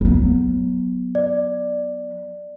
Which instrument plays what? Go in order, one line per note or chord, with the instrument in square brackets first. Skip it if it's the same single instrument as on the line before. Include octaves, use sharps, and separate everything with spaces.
[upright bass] F#3 B3
[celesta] D5